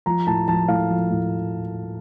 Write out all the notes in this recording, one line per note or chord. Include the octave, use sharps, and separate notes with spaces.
F3 A#5
A2 A5
F3 A5
A2 F5
F3
A2